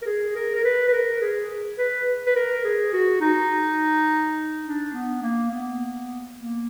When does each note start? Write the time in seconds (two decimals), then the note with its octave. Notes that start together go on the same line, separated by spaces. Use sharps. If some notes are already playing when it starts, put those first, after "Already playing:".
0.02 A#4
0.06 G#4
0.35 A#4
0.55 A#4
0.64 B4
0.87 B4
0.93 A#4
1.21 G#4
1.78 B4
2.26 B4
2.36 A#4
2.64 G#4
2.93 F#4
3.21 D#4
4.64 D4
4.93 B3
5.22 A#3
5.51 B3
6.37 A#3